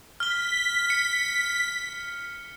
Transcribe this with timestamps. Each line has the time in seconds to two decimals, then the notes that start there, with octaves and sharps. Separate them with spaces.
0.20 F6 B6 G7
0.90 C#7